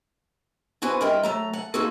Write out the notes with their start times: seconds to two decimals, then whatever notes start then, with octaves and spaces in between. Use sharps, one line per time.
0.82 B3 E4 F#4 B4 C5 G#5
1.01 G2 E4 F4 A#4 D#5 G5
1.23 F#3 A3 A#5
1.53 F#5
1.74 A#3 D#4 F4 F#4 G#4 A4